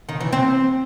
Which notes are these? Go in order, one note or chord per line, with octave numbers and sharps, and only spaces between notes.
D#3
E3
C4